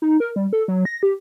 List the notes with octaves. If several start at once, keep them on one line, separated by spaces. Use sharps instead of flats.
D#4
A#4
G3
A4
F#3
A#6
G4